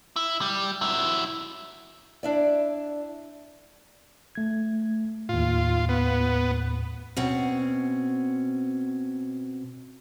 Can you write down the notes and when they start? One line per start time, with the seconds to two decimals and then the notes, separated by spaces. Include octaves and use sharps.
0.16 E4
0.41 G3
0.81 F#3 E4
2.23 D4 E4 D5
4.35 A3 G#6
5.29 D#2 A2 F4
5.89 B3
7.16 B2 C4 C#4